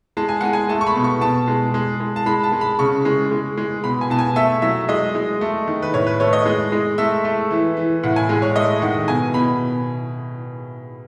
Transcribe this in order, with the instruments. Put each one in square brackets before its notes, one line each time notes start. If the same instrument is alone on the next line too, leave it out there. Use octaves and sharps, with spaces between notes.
[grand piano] G#3 A5
G#5
G#3 F#5
G#5
A3 A5
C#6
B5
B2
C#6
B2 A5
G#3
G#3
G#3
A5
G#3 B5
A5
G#3
B5
C#3 C#6
G#3
G#3
G#3
B2 B5
G#5
B2 A5
G#5
A3 E5
F#3 E5
G#3 D#5
G#3
A3
D#3
B4
A2 C#5
B4
A3 C#5
D#5
G#3
G#3
A3 E5
A3
E3
E3
A2 F#5
G#5
G#3 G#5
C#5
A3 D#5
D#3 F#5
B2 G#5
B2 B5